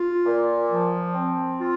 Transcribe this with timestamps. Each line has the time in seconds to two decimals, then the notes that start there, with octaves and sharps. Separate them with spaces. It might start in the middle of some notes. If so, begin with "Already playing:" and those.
Already playing: F4
0.25 A#2
0.70 F3
1.15 C4
1.59 F4